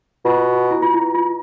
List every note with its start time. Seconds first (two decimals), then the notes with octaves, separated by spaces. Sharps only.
0.25 B2 F4
0.71 E4
0.82 F4
0.94 E4
1.15 F4